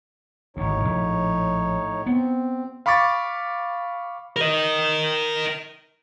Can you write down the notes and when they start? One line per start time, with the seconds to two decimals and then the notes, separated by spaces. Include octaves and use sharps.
0.57 G#1 D2 A2 D#4 C#5
0.85 A#1
2.06 B3 C4
2.86 F5 B5 C#6 D6 A6
4.36 A#4 D#5